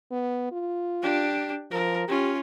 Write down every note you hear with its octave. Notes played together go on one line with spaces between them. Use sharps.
B3
F4
D4 G4
F3 A#4
C#4 F4 G4